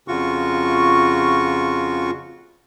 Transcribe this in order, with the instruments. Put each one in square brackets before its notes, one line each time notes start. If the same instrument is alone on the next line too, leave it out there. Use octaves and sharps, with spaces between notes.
[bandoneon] F2 C#3 F4 F#4 C#6